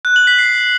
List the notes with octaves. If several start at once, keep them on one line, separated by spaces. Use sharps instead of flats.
F#6
F#7
B6
C7